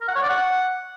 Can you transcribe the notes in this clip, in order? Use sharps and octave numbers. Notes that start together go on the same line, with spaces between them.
A#4
F#5
C#5
D5
F#5